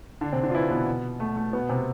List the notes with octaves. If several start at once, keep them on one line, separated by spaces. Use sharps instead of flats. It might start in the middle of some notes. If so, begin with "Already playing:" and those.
D3 D4
C3 C4
D3 D4
F4
E3 E4
B2 B3
A3
A3
B2 B3
C3 C4